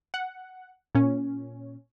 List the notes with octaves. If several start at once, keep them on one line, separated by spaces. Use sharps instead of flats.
F#5
A#2 C#4